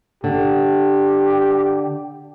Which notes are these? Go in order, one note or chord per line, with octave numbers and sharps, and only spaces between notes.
D3 G4